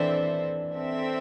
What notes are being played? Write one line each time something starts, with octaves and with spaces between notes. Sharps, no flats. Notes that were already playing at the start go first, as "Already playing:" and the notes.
Already playing: E3 C4 D4 A4 C5 E5
C4 A4 E5